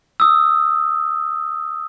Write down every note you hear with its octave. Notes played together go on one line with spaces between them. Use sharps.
D#6 E6